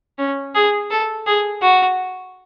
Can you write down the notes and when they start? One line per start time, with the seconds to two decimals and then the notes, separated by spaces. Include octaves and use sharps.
0.18 C#4
0.55 G#4
0.90 A4
1.27 G#4
1.62 F#4